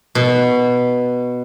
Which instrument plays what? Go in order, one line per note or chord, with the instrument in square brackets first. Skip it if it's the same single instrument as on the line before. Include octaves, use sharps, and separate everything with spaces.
[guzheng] B2